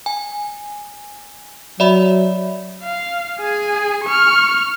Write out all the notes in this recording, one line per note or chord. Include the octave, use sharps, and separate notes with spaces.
G#5
F#3 D5 E5 B5
F5
G#4 G#5
C#6 F6